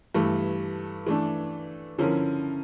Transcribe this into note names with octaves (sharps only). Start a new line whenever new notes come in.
G2 E3 A3
E3 A3 D4
D3 F3 C#4 E4 A#4